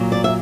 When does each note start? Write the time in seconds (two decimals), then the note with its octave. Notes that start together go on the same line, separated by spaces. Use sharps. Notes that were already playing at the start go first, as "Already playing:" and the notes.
Already playing: A#2 F#3
0.12 D5
0.24 E5